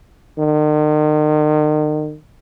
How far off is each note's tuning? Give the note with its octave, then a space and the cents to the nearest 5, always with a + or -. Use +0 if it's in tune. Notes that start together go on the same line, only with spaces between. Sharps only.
D#3 -40